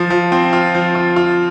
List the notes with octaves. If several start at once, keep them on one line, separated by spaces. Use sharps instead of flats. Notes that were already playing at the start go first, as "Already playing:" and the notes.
Already playing: F3
F3
C4
F4
F3
F4
F4